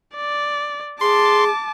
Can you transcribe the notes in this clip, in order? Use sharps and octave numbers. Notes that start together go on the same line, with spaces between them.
D5
G#4 A5 C6 D6